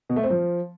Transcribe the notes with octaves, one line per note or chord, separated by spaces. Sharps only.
B2
A3
C4
F3